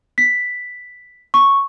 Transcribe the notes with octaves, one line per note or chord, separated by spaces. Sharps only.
B6
C#6